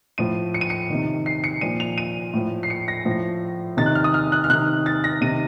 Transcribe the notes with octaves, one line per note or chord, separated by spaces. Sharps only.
A2 F3 D#7
C#7
D#7
C#7
C3 D#3
C7
C#7
A#2 F3 D#7
F7
D#7
A2 F3
C7
C#7
A#6
A2 F3
C3 D#3 A6
F#6
F6
D#6
F6
F#6
F6
C3 D#3 F#6
A6
A#6
C3 D#3 D#7